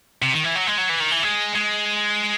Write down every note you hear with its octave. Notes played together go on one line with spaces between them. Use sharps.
C3
D#3
E3
F#3
G#3
F#3
E3
D#3
E3
G#3
G#3